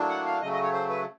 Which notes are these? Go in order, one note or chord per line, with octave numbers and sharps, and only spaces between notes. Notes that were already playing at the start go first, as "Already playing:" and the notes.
Already playing: A2 F#3 A#3 D4
F#5
F5
C#3 F#3 A3 D#5
D#5
C#5
C5
B4